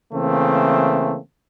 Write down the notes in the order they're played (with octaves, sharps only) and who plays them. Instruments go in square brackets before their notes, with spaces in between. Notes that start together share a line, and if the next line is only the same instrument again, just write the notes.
[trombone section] C#3 E3 A3 A#3 C4